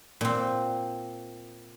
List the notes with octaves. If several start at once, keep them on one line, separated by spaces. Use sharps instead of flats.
A#2 C4